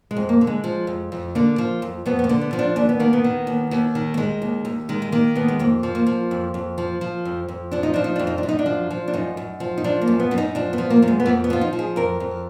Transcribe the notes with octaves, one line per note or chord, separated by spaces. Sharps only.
G#3
F2
A#3
D3
G#3
F3
F2
F2
D3 A#3
F3
F2
F2 B3
B3
A#3
D3
B3
F3
D4
D#2 D4
B3
D#3 A#3
B3
D#3
D#2
D#2
D#3
A#3
D#3 G#3
D#2
D#2
D#3 G#3
G#3
D#3 A#3
D#2 B3
G#3
F2 A#3
F3
A#3
F3
F2
F2
F3
F3
F2
F2
F3 D4
D#4
F3 D4
D#4
F2 D4
D#4
D4
F#2
D#4
D4
F3
F3
D4
F#2 D#4
F#2
F3
D#4
F3 D4
A#3
F#2
B3
F#2
D#4
F3 D4
B3
F3
A#3
F#2 A#3
G#3
B3
F2 A#3
B3
F3 F4
D#4
F3
G#4
F2 A#4
F2